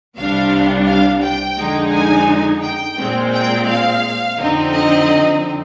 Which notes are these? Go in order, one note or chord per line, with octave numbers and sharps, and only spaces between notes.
C2 C3 G3 D4 F5
F5
G5
F2 D3 G#3 D#4
G#5
G5
A#2 G#3 C4
G5
F5
F2 D3 F3 C4 D#4
D#5